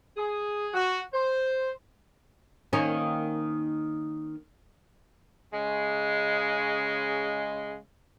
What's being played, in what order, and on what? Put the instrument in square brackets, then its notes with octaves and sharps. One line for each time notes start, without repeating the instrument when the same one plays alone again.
[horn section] G#4
F#4
C5
[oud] D#3 A#3 C#4
[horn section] C#3 G#3